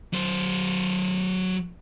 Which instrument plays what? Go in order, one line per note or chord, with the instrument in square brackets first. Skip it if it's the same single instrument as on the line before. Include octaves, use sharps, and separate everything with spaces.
[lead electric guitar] F#3 C5